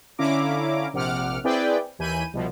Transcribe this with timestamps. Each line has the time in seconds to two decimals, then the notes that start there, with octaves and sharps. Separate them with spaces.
0.18 D3 C#4 E4 F5 A#5 D6
0.94 A#1 C3 F#5 D6 F6
1.44 C4 E4 G#4 B4 D5 G5
1.99 D#2 E3 G#5 B5 G6 D#7
2.33 C2 B2 F3